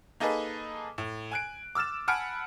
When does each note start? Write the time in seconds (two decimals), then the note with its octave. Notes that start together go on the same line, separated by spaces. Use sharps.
0.20 A#3 D#4 G#4 A4 B4 D#5
0.98 A2
1.32 G#5 F#6 D7
1.75 D6 E6 F6 A6 E7
2.08 F#5 G#5 A5 B5 F6 D7